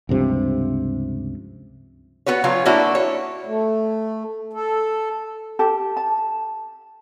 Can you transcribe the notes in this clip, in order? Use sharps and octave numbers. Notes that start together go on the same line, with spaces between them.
C#2 G2 C3 F3
B3 F#4 B4 C#5
C#3 F#3 F4
A#3 C#4 D4 E4 F#4
C#5
A3
A4
G4 A4 A5
A5